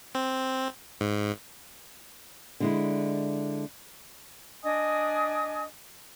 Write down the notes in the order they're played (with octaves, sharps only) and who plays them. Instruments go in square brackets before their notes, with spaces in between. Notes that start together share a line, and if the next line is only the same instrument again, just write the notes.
[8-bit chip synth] C4
G#2
[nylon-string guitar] D3 G#3 E4
[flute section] D4 D#5 G#5 D#6